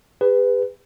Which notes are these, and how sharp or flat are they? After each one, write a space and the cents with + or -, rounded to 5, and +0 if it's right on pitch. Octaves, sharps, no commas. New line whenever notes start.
G#4 -45 B4 +15